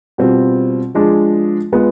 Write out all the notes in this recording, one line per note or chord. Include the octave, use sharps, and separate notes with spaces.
B2 G3 C4 F4
F3 G#3 D4 G#4
G#3 B3 F4